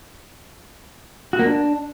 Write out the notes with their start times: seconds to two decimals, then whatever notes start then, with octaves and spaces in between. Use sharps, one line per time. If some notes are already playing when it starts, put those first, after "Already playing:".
1.33 F#4
1.39 A#3
1.45 D4